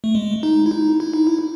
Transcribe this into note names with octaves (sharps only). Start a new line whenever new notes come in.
A3
G#3
D#4
E4
D#4
E4
D#4
E4